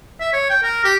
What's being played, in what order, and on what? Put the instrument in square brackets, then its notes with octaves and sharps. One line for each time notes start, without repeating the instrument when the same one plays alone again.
[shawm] E5
C#5
G5
A#4
G4